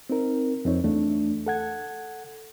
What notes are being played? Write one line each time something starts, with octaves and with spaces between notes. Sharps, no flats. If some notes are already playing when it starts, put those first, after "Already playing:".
C4 D#4 A#4
F2 C4 D#4 C#5
E2 A3 D4
A4 F#5 G#6